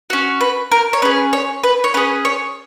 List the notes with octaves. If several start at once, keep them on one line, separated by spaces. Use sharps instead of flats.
C#4 F#4 C#5
B4
A#4
C#5
C#4 G#4 B4
C#5
B4
C#5
C#4 G#4 B4
C#5